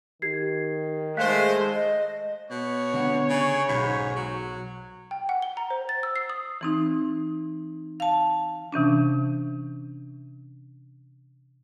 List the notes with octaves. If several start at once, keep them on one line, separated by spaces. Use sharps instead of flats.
D#3 G4 G#6 C7
G#3 A3 C5 F5 F#6 B6
D#5
B2 C#5
D3 B3 F#5
C#3
B1 G#2 B5
F#3
G5
F#5
G7
A#5
C5
A6
E6
C7
D#6
E3 C4 D#4
F5 A5
C3 E3 C#4 D4